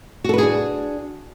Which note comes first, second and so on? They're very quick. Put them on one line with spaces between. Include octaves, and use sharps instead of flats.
F#4 A4 B4 G#4 D4